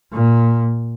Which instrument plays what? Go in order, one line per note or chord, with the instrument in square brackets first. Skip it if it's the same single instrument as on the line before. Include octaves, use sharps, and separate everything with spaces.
[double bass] A#2